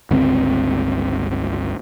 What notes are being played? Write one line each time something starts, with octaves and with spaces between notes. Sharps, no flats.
G1 C#2 C4